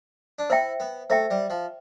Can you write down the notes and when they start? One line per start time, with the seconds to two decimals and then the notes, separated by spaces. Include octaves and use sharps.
0.39 D4
0.50 E4 C5 E5 G5
0.80 B3
1.10 A3 C5 E5 G5
1.31 G3
1.50 F3